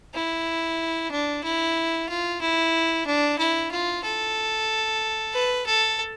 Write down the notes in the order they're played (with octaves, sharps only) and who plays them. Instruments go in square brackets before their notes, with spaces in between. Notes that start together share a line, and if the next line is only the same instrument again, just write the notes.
[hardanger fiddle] E4
D4
E4
F4
E4
D4
E4
F4
A4
B4
A4